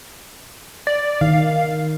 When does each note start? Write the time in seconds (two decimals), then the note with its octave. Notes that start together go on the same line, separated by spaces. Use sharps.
0.87 D5
1.21 D#3 F5